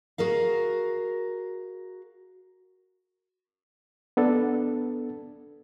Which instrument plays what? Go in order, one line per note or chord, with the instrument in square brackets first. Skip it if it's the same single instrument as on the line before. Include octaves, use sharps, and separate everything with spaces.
[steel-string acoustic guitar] F#4 G#4 A#4 F5
[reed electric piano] B3 D4 A4